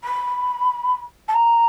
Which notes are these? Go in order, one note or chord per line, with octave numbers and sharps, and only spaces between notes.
B5
A5
A#5